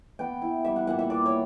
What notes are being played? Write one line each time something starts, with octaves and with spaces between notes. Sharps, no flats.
B3 G5
E4
G3 E5
F#5
A#2 F#5
E5
B3 D5
C#5